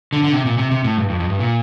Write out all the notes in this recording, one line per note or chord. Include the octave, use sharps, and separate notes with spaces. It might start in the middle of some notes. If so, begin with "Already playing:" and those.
D3
D3
C3
A#2
C3
C3
A2
G2
F2
F2
G2
A#2